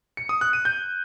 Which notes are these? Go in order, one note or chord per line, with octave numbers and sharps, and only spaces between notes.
C#7
D#6
F#6
D#7
G6